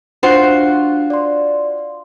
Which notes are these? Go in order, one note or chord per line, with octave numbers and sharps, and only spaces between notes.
D4 F4 F#4 C5 F#5 F#6
D5 C6